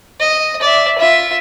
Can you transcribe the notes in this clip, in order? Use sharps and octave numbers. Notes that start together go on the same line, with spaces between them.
D#5
D5 E5
F4 E5